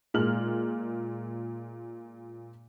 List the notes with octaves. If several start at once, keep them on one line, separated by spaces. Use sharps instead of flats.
A#2 G#3 F6 F#7